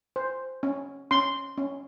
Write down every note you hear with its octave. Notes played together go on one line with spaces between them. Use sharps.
C5
C#4
C#4 C6
C#4